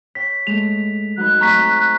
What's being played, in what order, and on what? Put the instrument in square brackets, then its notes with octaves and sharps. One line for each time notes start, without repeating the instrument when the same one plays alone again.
[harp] C#5 G5 [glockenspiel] B6
[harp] G#3 A3 [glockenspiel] F7
[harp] F#3 D#4 B4 [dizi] F#6
[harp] A3 C4 [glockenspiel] A#5 C#6 B6